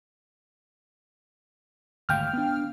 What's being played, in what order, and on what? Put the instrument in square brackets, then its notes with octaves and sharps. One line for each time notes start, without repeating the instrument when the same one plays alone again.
[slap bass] G#1 D2 G2 [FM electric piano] F5 G5 F6
[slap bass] B3 D4